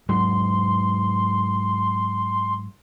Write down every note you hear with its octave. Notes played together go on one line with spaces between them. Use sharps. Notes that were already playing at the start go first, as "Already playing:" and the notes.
G#2 F#3 C6